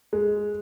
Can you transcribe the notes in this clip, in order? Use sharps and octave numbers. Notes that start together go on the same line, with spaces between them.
G#3